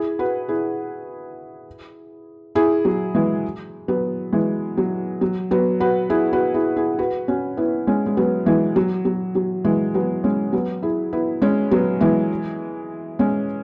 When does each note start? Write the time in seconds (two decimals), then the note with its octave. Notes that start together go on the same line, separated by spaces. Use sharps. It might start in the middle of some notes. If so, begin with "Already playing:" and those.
Already playing: E4 G#4
0.19 F#4 B4
0.49 E4 G#4
2.55 E4 G#4
2.85 F#3
3.15 E3 G#3
3.88 F#3 B3
4.33 E3 G#3
4.78 F#3
5.21 F#3
5.51 F#3 B3
5.80 F#4 B4
6.10 E4 G#4
6.33 F#4 B4
6.54 E4 G#4
6.76 E4 G#4
6.99 F#4 B4
7.28 C#4 F#4
7.57 B3 E4
7.87 G#3 C#4
8.06 G#3
8.17 F#3 B3
8.46 E3 G#3
8.76 F#3
9.05 F#3
9.35 F#3
9.65 E3 G#3
9.94 F#3 B3
10.24 G#3 C#4
10.53 F#3 B3
10.83 E4 G#4
11.13 B3 E4
11.42 G#3 C#4
11.71 F#3 B3
12.01 E3 G#3
13.19 G#3 C#4